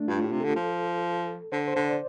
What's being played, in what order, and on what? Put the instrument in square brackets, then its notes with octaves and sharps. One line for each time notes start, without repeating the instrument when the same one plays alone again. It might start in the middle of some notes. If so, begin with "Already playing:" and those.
Already playing: [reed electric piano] A3 D4
[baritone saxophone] G2 [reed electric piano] F4
[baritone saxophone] A2 [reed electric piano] G4
[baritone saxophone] C3
[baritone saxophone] D3 [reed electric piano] A4
[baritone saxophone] F3
[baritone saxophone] D3 [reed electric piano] C5
[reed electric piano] C5
[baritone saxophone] D3
[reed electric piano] D5